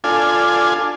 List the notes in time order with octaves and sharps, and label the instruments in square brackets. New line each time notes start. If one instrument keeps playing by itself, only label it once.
[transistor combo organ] D4 F4 A4 G#5